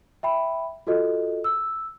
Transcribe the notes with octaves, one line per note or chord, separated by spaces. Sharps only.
E5 G5 B5
F4 F#4 A4 D#5
E6